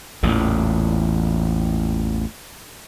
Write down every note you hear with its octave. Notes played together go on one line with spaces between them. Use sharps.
A1 E2 A#2